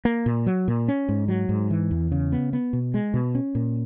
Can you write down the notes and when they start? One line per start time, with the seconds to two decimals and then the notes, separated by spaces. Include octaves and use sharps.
0.05 A#3
0.26 A#2
0.46 F#3
0.68 A#2
0.88 C#4
1.09 G#2
1.28 F#3
1.49 G#2
1.71 E3
1.91 E2
2.12 C#3
2.32 B3
2.53 B3
2.73 B2
2.94 G#3
3.14 B2
3.35 C#4
3.55 A#2